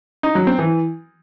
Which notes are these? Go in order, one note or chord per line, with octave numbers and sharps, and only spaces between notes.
D#4
F#3
C4
E3